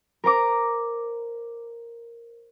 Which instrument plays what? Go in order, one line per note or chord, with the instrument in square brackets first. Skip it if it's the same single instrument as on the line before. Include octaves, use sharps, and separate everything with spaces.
[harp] A#4 C5 A#5 D6